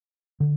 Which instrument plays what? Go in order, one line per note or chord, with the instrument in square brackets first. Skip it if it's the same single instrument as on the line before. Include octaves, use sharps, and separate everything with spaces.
[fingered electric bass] D3